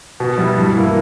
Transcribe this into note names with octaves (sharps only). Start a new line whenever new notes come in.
B2
G3 B3 E4
G2
E3 A#3 E4